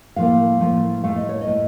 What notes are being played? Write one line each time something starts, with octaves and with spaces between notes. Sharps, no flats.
A2 F3 A#3 F5
A2 F3 A#3
A2 A3 F5
D#5
C#5
D#5
A2 A3